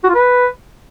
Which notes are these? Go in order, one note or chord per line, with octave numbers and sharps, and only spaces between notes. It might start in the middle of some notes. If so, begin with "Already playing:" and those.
F#4
F4
B4